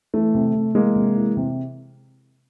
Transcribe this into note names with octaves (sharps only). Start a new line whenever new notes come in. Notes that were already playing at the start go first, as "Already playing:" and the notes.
E3 A3
C3
C3
E3 G#3 A#3
C3
E3
C3